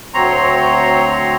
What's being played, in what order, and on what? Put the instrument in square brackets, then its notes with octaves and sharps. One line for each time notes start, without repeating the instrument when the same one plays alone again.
[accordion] D2 F#3 C4 C#5 A#5 C6